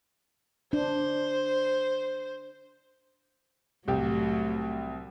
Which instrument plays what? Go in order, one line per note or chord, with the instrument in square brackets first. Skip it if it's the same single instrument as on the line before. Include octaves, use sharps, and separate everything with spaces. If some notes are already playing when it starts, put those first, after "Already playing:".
[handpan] D4 [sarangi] C5
[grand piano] C2 G4 [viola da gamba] A2 F#3